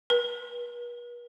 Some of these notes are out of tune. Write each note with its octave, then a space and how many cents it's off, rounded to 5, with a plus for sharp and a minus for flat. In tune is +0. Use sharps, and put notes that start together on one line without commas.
B4 -45